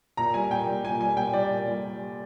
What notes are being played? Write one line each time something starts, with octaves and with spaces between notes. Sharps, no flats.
A#2 A#5
G3 G#5
A#2 G5
G3
A#2 G#5
G3 G#5
A#2 G5
G3 D5
A#2
G3